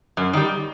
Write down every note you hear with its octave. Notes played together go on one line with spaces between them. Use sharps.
F#2
D#3 G3